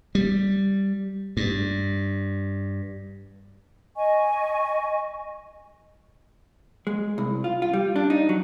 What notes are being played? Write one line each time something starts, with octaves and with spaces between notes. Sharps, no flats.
G3
G2
D#5 G#5 C#6
G#3
C2
F4
F4
G3
D4
D#4
F#3